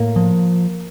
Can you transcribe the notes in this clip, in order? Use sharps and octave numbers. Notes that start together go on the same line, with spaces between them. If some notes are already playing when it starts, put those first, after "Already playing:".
Already playing: A2 A#3
F3